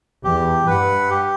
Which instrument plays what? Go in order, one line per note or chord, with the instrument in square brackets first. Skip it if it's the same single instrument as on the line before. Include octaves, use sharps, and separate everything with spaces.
[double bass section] E2 [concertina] G4
[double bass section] G2 [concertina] B4 F#5
[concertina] G4